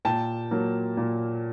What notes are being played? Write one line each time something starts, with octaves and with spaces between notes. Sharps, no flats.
A#2 G5 A5
F#3 A#3
A#2